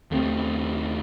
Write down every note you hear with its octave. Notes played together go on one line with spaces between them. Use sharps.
D#2 A3 C4